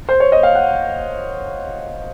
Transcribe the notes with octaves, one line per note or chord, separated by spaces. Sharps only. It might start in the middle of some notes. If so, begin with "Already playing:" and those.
C5
C#5
D#5
F5
F#5